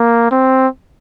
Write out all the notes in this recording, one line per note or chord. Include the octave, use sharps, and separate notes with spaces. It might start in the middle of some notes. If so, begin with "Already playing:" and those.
Already playing: A#3
C4